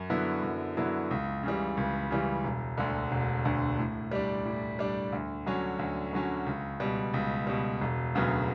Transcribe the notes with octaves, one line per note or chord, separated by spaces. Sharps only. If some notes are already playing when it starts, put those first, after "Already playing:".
Already playing: F#2
D3 F#3 B3 E4
F#2
D3 F#3 B3 E4
C#2
C#3 E3 G3
C#2
C#3 E3 G3
E1
D2 D3
E1
D2 D3
A2
G3 D4
A2
G3 D4
D2
D3 F#3 C#4
D2
D3 F#3 C#4
C#2
B2 G3
C#2
B2 G3
E1
D2 C#3 F#3 B3